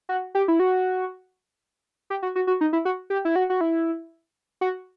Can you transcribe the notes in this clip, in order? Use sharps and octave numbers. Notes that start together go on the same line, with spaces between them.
F#4
G4
E4
F#4
G4
F#4
F#4
F#4
D#4
E4
F#4
G4
E4
F#4
F#4
E4
F#4